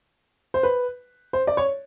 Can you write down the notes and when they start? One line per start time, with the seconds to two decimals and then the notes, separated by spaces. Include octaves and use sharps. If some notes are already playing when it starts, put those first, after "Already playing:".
0.54 C5
0.63 B4
1.33 C5
1.47 D5
1.57 C#5